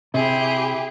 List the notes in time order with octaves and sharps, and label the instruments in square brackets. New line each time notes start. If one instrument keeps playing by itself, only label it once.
[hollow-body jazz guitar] C3 [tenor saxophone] E4 [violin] G4 G#4